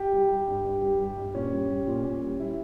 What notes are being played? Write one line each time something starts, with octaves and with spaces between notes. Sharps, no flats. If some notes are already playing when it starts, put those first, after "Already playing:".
Already playing: G4
G3
G3
G2
G2
G3
G3
G2
A#2 C#4
G3
G3
A#2
A#2 C#4
G3
G3 E4